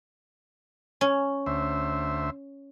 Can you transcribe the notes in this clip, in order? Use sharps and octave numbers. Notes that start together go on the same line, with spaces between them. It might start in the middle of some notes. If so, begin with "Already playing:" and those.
C#4
D2 C5 E5